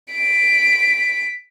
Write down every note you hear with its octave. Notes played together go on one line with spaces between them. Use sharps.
B6 D7